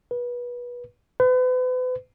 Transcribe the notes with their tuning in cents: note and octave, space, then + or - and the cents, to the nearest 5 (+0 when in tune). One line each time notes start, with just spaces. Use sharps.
B4 -25
B4 +40